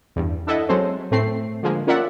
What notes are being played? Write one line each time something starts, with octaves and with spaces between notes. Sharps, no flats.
E2 G2
D4 E4 A4 D#5 F#5
F#3 G#3 C4 A4 C5 C#5
A2 A3 C4 C7
D3 F3 G#3 A#3
C#4 F4 A#4 D5 E5 F#5